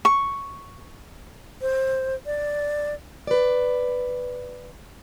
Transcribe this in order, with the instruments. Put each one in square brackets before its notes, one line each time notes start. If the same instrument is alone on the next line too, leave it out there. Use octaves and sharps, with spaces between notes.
[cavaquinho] C#6
[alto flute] C5
D5
[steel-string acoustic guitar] B4 D5